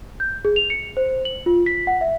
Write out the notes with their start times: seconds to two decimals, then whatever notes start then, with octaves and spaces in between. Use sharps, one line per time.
0.20 G6
0.45 G#4
0.56 F7
0.70 C#7
0.97 C5
1.25 F#7
1.46 F4
1.66 B6
1.87 F#5
2.01 E5